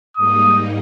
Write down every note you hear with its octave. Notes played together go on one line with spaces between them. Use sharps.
G#2 G3 A#3 D#4 D#6